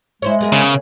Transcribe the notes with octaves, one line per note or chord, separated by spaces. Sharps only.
G#3 E4 C5 C#5
B3 G#4 A#4
C#3